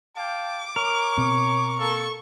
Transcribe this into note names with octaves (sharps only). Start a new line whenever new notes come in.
F5 G5 A5 D6
A#4 C#5 C#6
B2 C4
A#3 A4 C#6